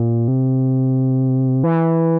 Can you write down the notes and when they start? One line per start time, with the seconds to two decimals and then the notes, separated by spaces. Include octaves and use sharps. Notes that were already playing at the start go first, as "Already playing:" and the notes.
Already playing: A#2
0.28 C3
1.63 E3